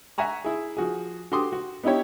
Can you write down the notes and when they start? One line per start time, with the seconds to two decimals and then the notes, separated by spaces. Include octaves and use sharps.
0.18 E5 F#5 G#5 A#5 C#6
0.44 E4 G#4
0.77 F3 F#4 G#4
1.32 F#4 G4 A4 C6 D6 D#6
1.52 F#4
1.84 B3 D#4 E4 G4 C#5